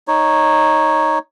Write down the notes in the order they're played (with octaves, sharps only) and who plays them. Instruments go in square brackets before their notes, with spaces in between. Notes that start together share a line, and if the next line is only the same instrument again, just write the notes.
[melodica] D#4 C#5